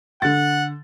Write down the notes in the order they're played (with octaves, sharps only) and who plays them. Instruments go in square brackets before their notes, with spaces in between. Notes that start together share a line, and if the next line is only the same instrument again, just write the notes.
[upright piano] D3 A6 [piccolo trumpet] F#5